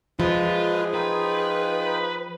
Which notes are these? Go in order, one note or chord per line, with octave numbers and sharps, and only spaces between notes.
F3 G#3 F4 G#4 B4 E5
D#4 F4 B4 G5